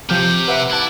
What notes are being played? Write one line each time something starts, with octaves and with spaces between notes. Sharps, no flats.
C3 F3 G4 F6 G6
B4 E5 F#5 D6
E4 F#5 A5 D6 F#6